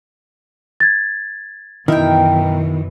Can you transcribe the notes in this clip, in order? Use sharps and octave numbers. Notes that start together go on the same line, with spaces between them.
G#6 A6
F#2 B2 D#3 E3 E4 A#4 G5